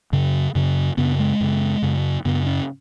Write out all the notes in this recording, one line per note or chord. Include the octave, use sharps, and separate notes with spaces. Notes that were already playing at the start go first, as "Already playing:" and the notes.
F#2 C#3
F#2 C#3
F#2 C#3 B3
G#3
F#2 C#3
F#2 C#3
F#2 C#3 B3
C#4